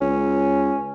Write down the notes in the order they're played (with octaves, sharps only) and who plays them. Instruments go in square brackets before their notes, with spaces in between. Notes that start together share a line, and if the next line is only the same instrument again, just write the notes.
[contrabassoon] C#2 [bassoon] C#4